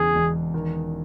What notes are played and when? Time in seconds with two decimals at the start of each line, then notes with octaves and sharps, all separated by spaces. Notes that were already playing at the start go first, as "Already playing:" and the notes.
Already playing: E1 E2 C#3 G#4
0.15 E1
0.54 D#3